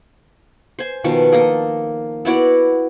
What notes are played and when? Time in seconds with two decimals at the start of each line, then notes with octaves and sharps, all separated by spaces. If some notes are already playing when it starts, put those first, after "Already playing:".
0.79 C5 G#5
1.04 B2 D#3 F3
1.32 A#3 A4 D#5
2.25 B3 E4 F#4 D5